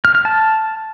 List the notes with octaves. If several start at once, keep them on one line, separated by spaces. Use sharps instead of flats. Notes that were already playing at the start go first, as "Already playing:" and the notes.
F6
F6
A5